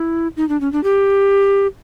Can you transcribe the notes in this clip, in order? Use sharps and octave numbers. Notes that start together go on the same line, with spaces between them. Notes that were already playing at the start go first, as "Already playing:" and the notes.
Already playing: E4
D#4
D4
C#4
D4
G4